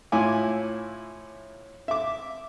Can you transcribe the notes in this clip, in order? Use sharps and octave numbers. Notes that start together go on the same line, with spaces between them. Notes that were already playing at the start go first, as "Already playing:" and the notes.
A2 E4 F4 G#5 D6
E5 D6